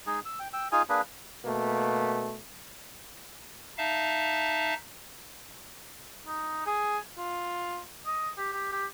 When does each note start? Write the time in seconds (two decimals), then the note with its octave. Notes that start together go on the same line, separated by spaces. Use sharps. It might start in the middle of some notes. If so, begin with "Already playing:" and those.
0.07 G#3 D#4 G#4
0.25 E6
0.39 G5
0.53 G5 E6
0.72 D#4 F4 G#4 G#5
0.89 A#3 D4 G#4 B4
1.45 B2 A3 A#3
3.78 D#4 E5 F5 A5
6.26 D#4
6.67 G#4
7.18 F4
8.06 D#5
8.37 G4
8.53 G4
8.72 G4